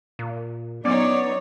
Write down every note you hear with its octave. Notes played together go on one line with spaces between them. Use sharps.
A#2
F#3 B3 C#4 D#4 C#5 D5